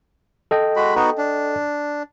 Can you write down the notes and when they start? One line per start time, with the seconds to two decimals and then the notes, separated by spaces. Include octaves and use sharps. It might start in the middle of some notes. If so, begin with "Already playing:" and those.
0.51 A4 D#5 G5
0.76 G#3 F#4 B5
0.96 B3 D#4 F#4
1.18 D4